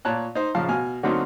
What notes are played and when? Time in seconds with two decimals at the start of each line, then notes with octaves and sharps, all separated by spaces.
0.05 A#2 C#5 A5 F#6
0.35 D#4 C5
0.55 A#1 C#3 F3 F5 A5
0.69 B2 G#5 F6
1.03 D3 F#3 A#3 C4 C#4 D#4